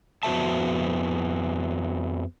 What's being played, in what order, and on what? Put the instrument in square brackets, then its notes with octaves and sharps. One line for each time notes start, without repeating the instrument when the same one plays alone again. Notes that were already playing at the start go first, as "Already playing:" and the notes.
[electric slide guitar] F2 B3 F#4 C5 E5 A5